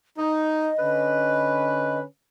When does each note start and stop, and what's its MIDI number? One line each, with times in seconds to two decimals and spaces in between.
0.17 0.70 63
0.17 1.99 75
0.78 2.03 50
0.78 2.03 61
0.78 2.03 71